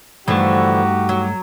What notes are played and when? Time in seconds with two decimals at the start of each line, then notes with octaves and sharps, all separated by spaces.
0.28 G2 D3 E3 F3 A3 D#4 F#4 G4
1.09 F#3